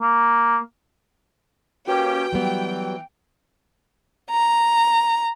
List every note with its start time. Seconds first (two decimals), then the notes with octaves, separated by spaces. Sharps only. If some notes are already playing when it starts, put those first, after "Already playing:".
0.02 A#3
1.87 A#3 C#4 F#4 G4 B4 G5
2.33 E3 F#3 G3 B3
4.30 A#5